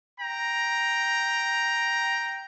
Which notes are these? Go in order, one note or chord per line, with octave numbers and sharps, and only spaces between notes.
G5 A#5